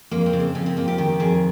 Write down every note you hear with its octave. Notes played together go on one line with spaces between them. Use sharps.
F2 A#3
C4
C#3
C4
F2 C#4
C4
F2 A#3
G4
D#3 G4
F2 G#4